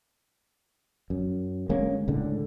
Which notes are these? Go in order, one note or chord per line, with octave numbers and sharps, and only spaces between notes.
F#2
D3 G#3 A#3 C#4
C#2 A2 D3